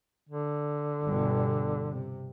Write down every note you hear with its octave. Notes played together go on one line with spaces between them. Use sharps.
D3
G1 G2 B2
C3